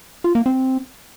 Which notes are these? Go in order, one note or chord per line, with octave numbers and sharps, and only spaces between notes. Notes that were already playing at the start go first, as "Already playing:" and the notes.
F4
A#3
C4